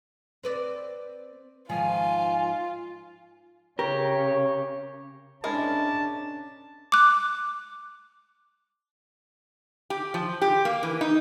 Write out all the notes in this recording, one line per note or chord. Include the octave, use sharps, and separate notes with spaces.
C4 B4 D5
G#2 D#3 F3 F4 G#5
C#3 G4 A#4 C#5
G#3 C#4 D4 E4 A#4 A5
D6 F#6
G4
F3
G4
A#3
E3
D#4